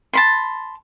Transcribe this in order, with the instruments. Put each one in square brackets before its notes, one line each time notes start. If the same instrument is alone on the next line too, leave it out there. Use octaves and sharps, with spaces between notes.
[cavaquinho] A5 B5 C6